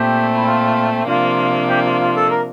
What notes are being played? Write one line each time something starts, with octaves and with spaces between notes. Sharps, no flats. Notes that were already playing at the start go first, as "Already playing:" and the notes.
Already playing: A#2 A3 C4 G4
E4
F4
C3 F3 A#3 D4 F4
G4
F4
F4
A4
A#4